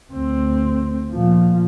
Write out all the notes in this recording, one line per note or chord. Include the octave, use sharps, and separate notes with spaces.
D2 C4
A#2 F3